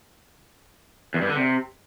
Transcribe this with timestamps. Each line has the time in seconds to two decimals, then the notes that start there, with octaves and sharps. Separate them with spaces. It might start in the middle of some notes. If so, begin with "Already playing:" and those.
1.14 E2
1.22 G2
1.29 D3
1.36 C3